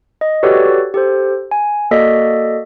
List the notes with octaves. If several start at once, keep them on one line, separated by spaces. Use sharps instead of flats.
D#5
F#4 G4 A4 B4 C#5 D5
G4 A4 C5
G#5
A#3 F#4 A4 D5 D#5 B6